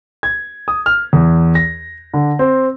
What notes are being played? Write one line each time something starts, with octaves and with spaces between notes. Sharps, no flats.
G#6
D#6
F6
E2
A#6
D3
C4